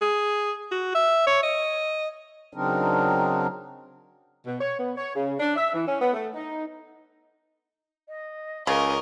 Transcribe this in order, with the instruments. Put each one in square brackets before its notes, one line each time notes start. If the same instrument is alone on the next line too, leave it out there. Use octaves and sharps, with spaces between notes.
[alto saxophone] G#4
F#4
E5
C#5
D#5
[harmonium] C#3 F#3 C4 D4 D#4 A#4
[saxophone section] B2
C#5
B3
C#5
C#3
D4
E5
E3
C#4
B3
A3
D#4
[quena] D#5
[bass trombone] C#2 [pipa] C#3 [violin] A#4 D#5 [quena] C#6